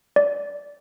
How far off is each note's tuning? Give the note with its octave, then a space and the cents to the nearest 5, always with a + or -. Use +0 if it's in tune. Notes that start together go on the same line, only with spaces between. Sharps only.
D5 -20